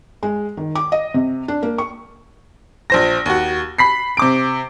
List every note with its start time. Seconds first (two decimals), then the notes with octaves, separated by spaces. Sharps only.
0.23 G#3
0.57 D#3
0.75 D6
0.92 D#5
1.14 C3
1.48 D4
1.63 A#3
1.78 C#6
2.90 A#1 C5 A#6
3.26 D#2 F#4
3.78 B5 B6 C7
4.17 C3 D6 D7